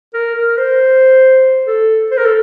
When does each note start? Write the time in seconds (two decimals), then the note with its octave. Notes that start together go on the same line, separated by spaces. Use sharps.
0.14 A#4
0.35 A#4
0.57 C5
1.66 A4
2.11 C5
2.18 A#4
2.25 A4